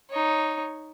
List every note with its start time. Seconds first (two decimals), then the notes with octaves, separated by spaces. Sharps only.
0.10 D#4 C#5